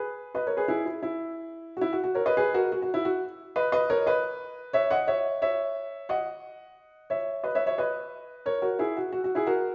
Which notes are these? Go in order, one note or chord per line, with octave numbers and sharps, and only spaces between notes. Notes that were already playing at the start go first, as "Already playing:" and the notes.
Already playing: G#4 B4
B4 D#5
A#4 C#5
G#4 B4
E4 G#4
E4
E4
F#4
E4
F#4
F#4
A#4 C#5
B4 D#5
G#4 B4
F#4 A#4
F#4
F#4
E4
F#4
B4 D#5
B4 D#5
A#4 C#5
B4 D#5
C#5 E5
D#5 F#5
C#5 E5
C#5 E5
D#5 F#5
C#5 E5
B4 D#5
C#5 E5
C#5 E5
B4 D#5
A#4 C#5
F#4 A#4
E4 G#4
F#4
F#4
F#4
E4 G#4
F#4 A#4